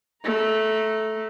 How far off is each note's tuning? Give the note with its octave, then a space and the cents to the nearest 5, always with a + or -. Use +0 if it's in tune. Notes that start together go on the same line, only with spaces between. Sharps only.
A3 -10 A#5 +0